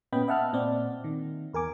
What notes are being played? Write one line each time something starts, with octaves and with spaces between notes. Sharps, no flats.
A#2 B3 C#4 D#5 G5 B5
D#5 E5 F#5 A5 F6 F#6
A#2 C4 D5
D#3
E2 A#4 G#5 D6